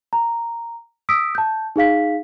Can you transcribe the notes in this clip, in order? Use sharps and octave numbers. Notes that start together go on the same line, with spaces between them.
A#5
D#6 E6 B6 D7
A5 G6
D#4 G#4 F5 B6